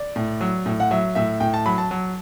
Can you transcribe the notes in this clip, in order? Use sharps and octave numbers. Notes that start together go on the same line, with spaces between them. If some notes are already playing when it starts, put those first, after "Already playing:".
Already playing: D5
A2
F#3
A2
F#5
F#3 E5
A2 E5
A2 G5
A5
F#3 B5
A5
F#3